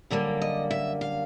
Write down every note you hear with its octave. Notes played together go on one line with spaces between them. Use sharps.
F#2 D3 G3 A#3
D#5
E5
F5